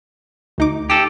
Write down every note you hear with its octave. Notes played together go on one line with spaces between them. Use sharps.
D2 D#4 D6
G4 A4 A#6 C7